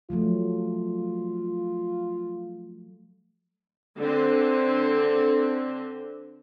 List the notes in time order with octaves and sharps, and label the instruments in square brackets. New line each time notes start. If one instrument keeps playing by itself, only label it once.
[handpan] F3 F#3 A3 [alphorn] F4
[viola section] D3 C4